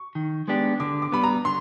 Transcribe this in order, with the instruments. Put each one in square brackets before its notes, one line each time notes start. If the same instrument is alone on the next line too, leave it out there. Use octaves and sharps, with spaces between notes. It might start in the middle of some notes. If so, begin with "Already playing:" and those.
Already playing: [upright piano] C#6
[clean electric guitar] D#3
G#3 B3 D4 G4
[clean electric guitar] D3 [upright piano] D6
[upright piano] D6
[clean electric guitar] G3 B3 [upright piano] B5
[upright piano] A#5
[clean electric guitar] D3 [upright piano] C6